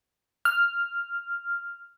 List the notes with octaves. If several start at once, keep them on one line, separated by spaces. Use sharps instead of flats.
F6